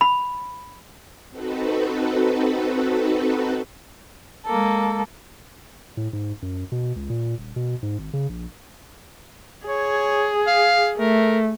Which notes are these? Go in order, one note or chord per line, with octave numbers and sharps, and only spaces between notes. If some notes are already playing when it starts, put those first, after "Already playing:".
B5
C4 D#4 F#4 A4 B4
G#3 A#3 A4
A2
G#2
F#2
B2
C#2
A#2
D#1
B2
G#2
G#1
C#3
A#1
G#4 C#5
F5
A3 A#4